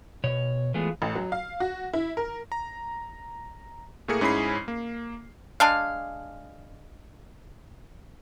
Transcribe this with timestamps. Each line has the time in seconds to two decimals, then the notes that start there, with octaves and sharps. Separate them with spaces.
0.24 B2 C#5
0.74 E3 G#3 A3 B3 F4 G#4
1.02 A1
1.15 F#3
1.32 F5
1.60 F#4
1.93 E4
2.17 A#4
2.52 A#5
4.08 A2 A3 A#3 G#4 A#4 C#7
4.21 G#2 C#4 E4 G#4 B5 C7
4.68 A#3
5.60 G#3 D4 F5